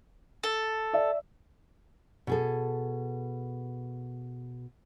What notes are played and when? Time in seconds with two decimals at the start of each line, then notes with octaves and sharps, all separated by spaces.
0.43 A4
0.93 D5 E5
2.27 B2 G#4 A4